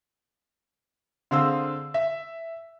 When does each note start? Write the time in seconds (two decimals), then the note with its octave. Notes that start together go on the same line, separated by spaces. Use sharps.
1.31 D3 C4 G#4 F5 E6
1.94 E5